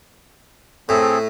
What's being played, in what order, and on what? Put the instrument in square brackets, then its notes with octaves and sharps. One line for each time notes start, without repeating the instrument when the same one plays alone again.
[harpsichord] A2 [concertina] C4 G#4 A4